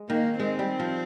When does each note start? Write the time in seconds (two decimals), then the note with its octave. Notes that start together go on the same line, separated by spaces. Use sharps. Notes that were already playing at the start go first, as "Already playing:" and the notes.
Already playing: G#3
0.09 D#3 A#3
0.39 G#3 C4
0.59 G3
0.80 F3